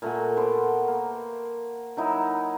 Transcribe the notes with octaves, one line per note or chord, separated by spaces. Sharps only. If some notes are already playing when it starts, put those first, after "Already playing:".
A#2 A3 F#4 G#5
B3 C5 A5 D6
A#3
F#3 D#4 E4